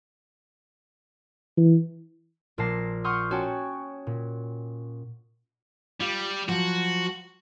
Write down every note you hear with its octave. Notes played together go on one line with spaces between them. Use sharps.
E3
A#1 A#2 A#3 A5 A#6 C7
F#5 C6 C#6 D#6 F6 G6
C#4 F#4 C#5 G5 A5
A#2
G3 F4
F3 F#3 F#4